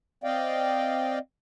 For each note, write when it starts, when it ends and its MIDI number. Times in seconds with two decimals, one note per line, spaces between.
0.24 1.19 60
0.24 1.19 74
0.24 1.19 75
0.24 1.19 77
0.24 1.19 79